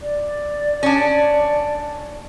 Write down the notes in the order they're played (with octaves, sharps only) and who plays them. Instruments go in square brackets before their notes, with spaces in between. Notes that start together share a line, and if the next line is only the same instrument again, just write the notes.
[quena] D5
[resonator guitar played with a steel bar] C#4 D4